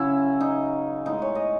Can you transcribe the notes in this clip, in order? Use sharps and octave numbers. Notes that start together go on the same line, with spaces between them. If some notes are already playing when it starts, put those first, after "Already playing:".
Already playing: C#3 F#3 C#4 E4
D#4
A2 E3 G#3 B3 D#4
C#5
D#5